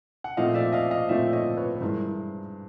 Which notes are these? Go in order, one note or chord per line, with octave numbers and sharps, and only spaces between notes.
F#5
A#2 F3 A3 C4 D#5 F5
D5 E5
D#5 F5
D#5 F5
A#2 F3 A3 C4 D5 E5
C#5 D#5
B4 C#5
B4
G2 E3 G#3 A#4 C5